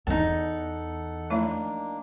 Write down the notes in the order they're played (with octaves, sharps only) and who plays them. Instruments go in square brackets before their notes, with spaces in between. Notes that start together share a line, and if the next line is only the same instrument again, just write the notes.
[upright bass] E2 [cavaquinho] D#4 A5 [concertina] A4 F#5
[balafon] F3 A3 E4 [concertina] A#3 D4